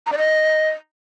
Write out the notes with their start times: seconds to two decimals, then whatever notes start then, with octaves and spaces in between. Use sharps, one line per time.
0.06 A#5
0.12 D5
0.18 D#5